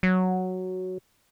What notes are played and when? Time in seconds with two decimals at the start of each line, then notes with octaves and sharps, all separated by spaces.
0.03 F#3